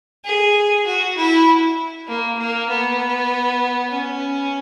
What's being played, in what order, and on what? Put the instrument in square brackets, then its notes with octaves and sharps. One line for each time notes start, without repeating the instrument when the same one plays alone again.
[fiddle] G#4
F#4
E4
A#3
A#3
B3
C#4